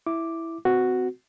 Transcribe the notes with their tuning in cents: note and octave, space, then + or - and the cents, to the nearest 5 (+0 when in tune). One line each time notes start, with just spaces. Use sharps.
E4 +0 D6 +0
C4 -35 F#4 +0